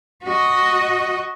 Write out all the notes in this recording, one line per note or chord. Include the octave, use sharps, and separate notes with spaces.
F#4 D#5